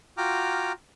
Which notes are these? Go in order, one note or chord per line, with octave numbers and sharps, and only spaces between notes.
F4 F#4 G5 A#5 D6 F6